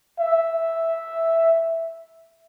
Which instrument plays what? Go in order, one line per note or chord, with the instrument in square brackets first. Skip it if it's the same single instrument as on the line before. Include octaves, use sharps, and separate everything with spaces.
[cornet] E5